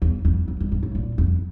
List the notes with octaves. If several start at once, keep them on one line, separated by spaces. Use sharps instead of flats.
E2
F2
F2
G2
G2
A2
A#2
F2